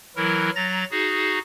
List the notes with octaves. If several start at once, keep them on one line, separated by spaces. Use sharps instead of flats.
E3 F#3 E4 A#4
F#3 A#5 A6 A#6
D#4 F#4 G#4